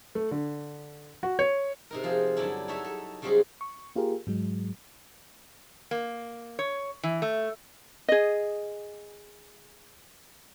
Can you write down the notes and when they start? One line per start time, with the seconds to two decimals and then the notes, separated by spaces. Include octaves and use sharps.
0.15 A3
0.31 D3
1.23 F#4
1.39 C#5
1.91 C3 D#4 A#4
2.03 F3 C4 F4 G#4
2.37 G2 D3 F#3 D4 E4
2.68 D#4 F#4 A4 C#5 E5
2.84 A4
3.22 C#3 G3 G#3 C4 F#4 G#4
3.61 C#6
3.96 A#3 F4 G4 G#4 A#4
4.27 G#2 F#3 G#3
5.91 A#3
6.59 C#5
7.03 E3
7.22 A3
8.08 G#4 D#5